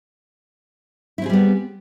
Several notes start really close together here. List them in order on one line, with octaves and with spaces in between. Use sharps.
E4 C4 G#4 G3 B3